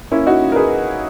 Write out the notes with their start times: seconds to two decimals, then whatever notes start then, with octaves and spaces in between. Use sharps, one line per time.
0.12 A#3 C#4 E4
0.27 D#4 F#4
0.42 C#2
0.52 A#4
0.56 G#4 B4